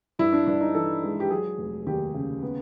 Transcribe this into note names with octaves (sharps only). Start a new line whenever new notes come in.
G2 E4
D4
G2 D4
D#4
E3 A4
G#3
G4
F#3 G#4
F1
D#2 G4
C#3
B3